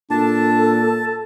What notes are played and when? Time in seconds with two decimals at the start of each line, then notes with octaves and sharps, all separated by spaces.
0.11 A#2 D4 A4 A5